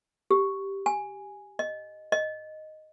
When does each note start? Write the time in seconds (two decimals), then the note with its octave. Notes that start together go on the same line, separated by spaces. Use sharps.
0.31 G4
0.86 G#5
1.59 D#5
2.12 D#5